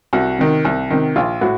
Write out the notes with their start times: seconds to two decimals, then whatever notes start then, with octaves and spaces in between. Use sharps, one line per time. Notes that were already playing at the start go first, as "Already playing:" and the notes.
0.13 C2 F#4
0.39 C3 D#3
0.65 C2
0.90 C3 D#3
1.16 A#1 F4
1.41 A2 F#4